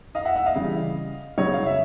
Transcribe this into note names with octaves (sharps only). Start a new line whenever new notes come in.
D#5 F5
E5 F#5
E5 F#5
D#5 F5
C#3 E3 G3
C#3 F#3 C#5 D#5
F5
E5